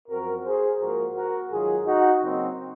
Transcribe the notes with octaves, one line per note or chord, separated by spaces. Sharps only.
F#2 F3 C4 F#4 A#4
G#4 C5
G#2 F3 A#3 F#4 A#4
F#4 A#4
G#2 D#3 F#3 F4 G#4
D#4 F#4
C#3 F#3 A#3 C4 D#4